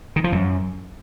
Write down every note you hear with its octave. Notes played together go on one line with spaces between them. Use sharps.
D#3
F3
F#2